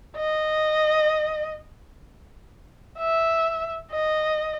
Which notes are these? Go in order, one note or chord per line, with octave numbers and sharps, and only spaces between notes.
D#5
E5
D#5